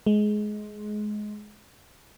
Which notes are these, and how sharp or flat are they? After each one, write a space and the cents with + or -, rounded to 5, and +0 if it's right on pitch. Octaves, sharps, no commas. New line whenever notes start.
G#3 +20